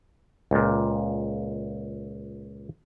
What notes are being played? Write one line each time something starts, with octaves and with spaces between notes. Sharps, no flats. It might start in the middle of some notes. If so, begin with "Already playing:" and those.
C#2 A#2